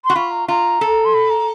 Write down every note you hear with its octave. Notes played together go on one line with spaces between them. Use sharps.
F#4 C6
F4 B5
A#5
F4 A#5
A4
C6
B5
A#5